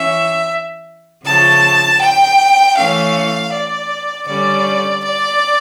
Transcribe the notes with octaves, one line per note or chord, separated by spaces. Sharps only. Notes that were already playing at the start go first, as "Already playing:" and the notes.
Already playing: E3 C#4 E5
C#3 F3 A3 A5
G5
E3 A3 C#4 F5
D5
D3 G3 C#4 D5
D5